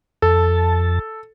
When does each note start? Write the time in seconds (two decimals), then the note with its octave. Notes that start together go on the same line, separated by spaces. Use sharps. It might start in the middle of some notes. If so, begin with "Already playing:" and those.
0.22 F2 A4 A5